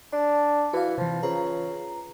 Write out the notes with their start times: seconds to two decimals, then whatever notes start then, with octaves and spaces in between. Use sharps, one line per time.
0.12 D4 A5
0.73 E3 F#4 F5
0.98 C3 E3 F3
1.23 C#3 F4 B4 A#5